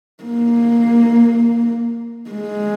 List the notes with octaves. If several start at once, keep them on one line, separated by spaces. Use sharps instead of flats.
A#3
G#3